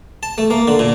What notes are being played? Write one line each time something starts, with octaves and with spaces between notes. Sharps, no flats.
A5
A3
A#3
D3
A#2